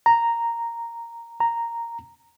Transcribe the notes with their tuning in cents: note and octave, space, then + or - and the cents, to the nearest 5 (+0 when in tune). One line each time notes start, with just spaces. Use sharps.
A#5 -5
A#5 -5